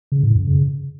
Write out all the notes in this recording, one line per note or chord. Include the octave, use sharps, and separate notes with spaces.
C#3
A2
F#2
C#3